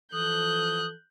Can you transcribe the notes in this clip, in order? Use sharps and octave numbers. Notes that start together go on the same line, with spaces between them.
E3 F3 A4 D#6 F#6 G6